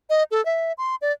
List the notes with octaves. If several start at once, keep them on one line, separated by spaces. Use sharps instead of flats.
D#5
A4
E5
C6
D5